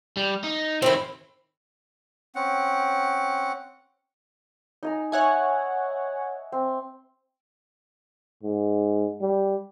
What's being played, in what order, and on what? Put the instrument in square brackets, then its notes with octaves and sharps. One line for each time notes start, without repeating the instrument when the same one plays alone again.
[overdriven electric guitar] G3
D#4
[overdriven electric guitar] A2 D#3 [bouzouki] C4 E4
[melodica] C4 C#4 F#5
[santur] D#4 G#5 A#5
[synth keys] C#5 F#5 G#5 [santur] E5
[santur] C4
[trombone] G#2
G3